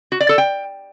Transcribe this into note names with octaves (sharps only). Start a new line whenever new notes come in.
F#4
D5
A4
G5